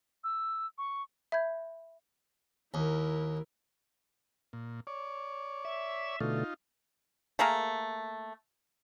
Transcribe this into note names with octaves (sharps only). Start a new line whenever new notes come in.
E6
C#6
E5 B5 G6 G#6
D#2 E4 A#4
A#2
C#5 D5
E5
B2 D3 A3 D#4 F4
A3 A#3 G#4 A#4